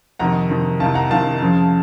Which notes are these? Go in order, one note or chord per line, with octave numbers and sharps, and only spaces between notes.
F2 C3 D#3 F#5 A#5
F2 C3 D#3
C2 C3 D#3 F5 A5
F#5 A#5
C2 C3 D#3 F5 A5
F2 C#3 F3